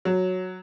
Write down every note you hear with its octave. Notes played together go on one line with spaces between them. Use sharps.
F#3